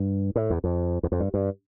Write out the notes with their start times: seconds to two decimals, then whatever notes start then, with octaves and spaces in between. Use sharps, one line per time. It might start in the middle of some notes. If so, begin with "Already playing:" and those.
Already playing: G2
0.36 A2
0.50 E2
0.64 F2
1.03 E2
1.12 F2
1.20 G2
1.34 G2